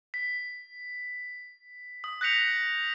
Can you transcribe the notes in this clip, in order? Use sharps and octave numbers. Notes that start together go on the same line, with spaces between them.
B6
D#6
F#6 G6 A#6 B6 C#7 F7